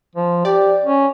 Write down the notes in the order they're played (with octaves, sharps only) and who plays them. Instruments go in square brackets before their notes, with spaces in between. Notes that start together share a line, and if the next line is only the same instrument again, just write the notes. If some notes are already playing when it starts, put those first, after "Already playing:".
[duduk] F3
[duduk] G4 [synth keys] D5
[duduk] C#4